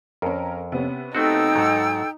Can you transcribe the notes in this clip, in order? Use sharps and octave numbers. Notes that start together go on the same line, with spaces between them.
F2 C#4 A#4
C3 B3 C#4
A3 C4 D#4 F#4 A4 G5 E6
G#2 F#3 A#5